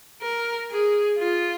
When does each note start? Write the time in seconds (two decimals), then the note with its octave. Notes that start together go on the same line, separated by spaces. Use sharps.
0.22 A#4
0.70 G#4
1.18 F4